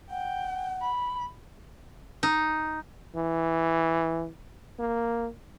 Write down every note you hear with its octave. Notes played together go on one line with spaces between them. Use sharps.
F#5 G5
B5
D#4
E3
A#3